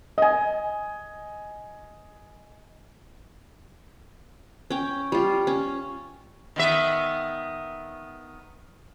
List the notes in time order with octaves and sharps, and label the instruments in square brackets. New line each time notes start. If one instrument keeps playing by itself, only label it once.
[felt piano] D#5 G#5
[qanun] C#4 G5
G3 F4
C#4
[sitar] D#3 B3 E5